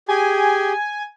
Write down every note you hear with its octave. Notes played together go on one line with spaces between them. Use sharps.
G4 G#4 G#5